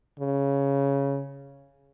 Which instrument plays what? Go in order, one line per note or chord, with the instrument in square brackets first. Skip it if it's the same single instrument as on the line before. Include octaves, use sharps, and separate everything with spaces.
[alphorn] C#3